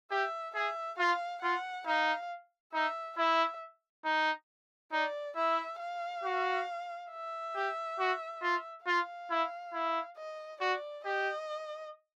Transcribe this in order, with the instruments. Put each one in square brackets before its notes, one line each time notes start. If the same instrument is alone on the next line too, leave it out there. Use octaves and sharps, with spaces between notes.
[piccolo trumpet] G4 [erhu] E5
[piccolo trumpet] G#4 [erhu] E5
[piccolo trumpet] F4 [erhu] F5
[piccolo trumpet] F4 [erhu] F#5
[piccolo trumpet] D#4 [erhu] F5
[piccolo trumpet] D#4 [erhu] E5
[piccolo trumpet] E4 [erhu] E5
[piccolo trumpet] D#4
[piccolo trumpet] D#4 [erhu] D5
[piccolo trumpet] E4 [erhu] E5
[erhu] F5
[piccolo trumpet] F#4
[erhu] E5
[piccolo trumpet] G4
F#4
F4
[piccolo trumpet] F4 [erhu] F5
[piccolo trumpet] E4
E4
[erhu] D#5
[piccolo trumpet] F#4 [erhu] D5
[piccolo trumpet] G4 [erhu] D#5